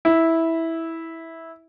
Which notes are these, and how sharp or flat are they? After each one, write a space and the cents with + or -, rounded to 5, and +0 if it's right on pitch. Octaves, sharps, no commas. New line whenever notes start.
E4 -10